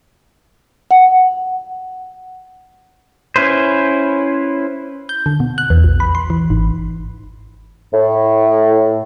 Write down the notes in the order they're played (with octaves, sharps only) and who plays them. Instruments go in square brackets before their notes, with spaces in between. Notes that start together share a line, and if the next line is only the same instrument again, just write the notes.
[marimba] F#5
[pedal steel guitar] C#4 E4 B4 C5
[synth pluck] G6
D3
B2
F#6
E2
A#1
B5
C6
E3
G#1
[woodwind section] A2